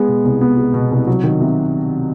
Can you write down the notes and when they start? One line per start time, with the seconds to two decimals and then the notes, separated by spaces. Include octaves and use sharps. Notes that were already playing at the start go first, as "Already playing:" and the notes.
Already playing: G#3 B3
0.08 B2
0.24 C2
0.41 B3
0.57 G#3
0.74 B2
0.92 C2
1.07 F#3
1.24 D#3
1.40 C3